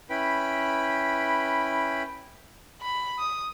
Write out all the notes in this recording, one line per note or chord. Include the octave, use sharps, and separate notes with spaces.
C#4 E4 B4 G5 B5
B5
D#6